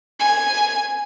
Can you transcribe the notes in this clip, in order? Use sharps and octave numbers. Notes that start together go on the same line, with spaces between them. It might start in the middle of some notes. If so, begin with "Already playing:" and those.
G#5